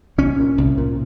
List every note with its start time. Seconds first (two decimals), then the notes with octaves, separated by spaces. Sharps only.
0.18 C2 C#4
0.39 A#2
0.58 C2
0.78 A#2